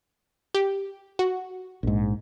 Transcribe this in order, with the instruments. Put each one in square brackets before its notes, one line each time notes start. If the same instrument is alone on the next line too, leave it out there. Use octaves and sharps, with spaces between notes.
[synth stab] G4
F#4
[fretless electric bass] A#1 G#2